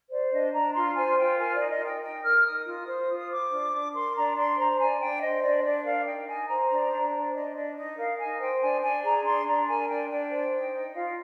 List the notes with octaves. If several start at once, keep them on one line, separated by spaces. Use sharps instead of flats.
C5 D5
D4 D#5
D4 A#5
F4 C6
C5 G#5
F4 G5
A#4 G#5
D5
D#4
D#5
D#4 G5
D#4 G5
A#4 F6
D#4 D#6
F4
C5
F4
D#6
C5 D6
D4
D4
A#4 C6
D4 A#5
D4 C6
C5 A#5
D4 G#5
D4 G5
C5 D#5
D4 D5
D4 D5
A#4 F5
D#4 G5
D#4 G#5
C5 A#5
D4
A#5
D4
C5
D4 D#5
D4 D#5
D#4 D#5
A#4 F5
D#4 G#5
C5 G5
D4 G#5
D4 G#5
G#4 A#5
D4 C6
D4 A#5
A#4 G#5
D4 G5
D4 G5
C5
D#4
D#4
F4 F5